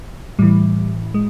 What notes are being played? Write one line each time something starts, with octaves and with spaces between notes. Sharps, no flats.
A2 E3 G3
G#3